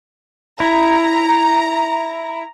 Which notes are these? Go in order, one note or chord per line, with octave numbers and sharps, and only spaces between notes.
E4 A#5